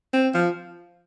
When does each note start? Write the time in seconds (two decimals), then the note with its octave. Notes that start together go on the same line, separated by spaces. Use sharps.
0.13 C4
0.34 F3